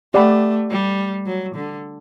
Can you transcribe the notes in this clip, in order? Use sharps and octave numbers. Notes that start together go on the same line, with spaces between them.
A3 G4 D5 F#5 B5
G3
F#3
D3